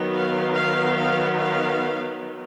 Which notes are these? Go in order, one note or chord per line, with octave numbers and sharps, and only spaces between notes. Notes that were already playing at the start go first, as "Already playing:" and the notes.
Already playing: D#3 F#3 B3
F5
F5
F5
F5